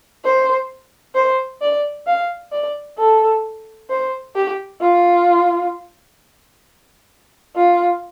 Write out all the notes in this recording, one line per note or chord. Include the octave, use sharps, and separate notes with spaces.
C5
C5
D5
F5
D5
A4
C5
G4
F4
F4